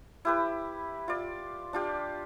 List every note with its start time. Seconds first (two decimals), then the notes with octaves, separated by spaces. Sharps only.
0.25 E4 G4 B4
1.08 F4 D5
1.73 D4 F4 G4